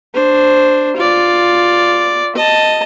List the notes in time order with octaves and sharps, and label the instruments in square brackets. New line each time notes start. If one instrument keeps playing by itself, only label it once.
[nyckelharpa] D4 C5
F4 D5
D#5 A5